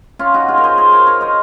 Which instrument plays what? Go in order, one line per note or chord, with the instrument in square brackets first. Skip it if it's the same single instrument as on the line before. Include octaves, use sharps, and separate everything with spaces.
[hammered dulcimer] C#4 F4
D#4 F#4
F4 G#4
A#4
G#4 C5
G#4 C5
A#4 C#5
A#4 C#5
C5 D#5